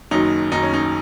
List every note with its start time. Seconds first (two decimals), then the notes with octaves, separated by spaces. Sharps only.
0.11 F#1 F#2 D#3 F#3 D#4
0.51 F#1 F#2 D#3 F#3 D#4
0.63 C#4
0.74 D#4